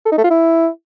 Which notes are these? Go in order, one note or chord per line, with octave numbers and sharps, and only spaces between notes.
A4
D#4
A3
F4
E4